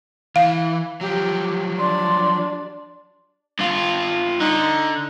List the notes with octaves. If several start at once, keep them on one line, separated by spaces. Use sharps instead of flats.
E3 F5
F3 F#3 G4
D4 C6
G2 F4
D3 D#4